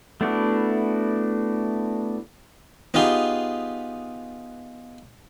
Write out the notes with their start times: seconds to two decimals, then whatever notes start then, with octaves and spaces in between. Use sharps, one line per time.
0.21 A3 B3 D4 E4 F#4
2.94 B3 D#4 F4 G4 G#4